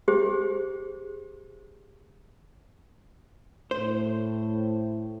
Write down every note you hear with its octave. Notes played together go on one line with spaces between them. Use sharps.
G4 G#4 C5
A2 C5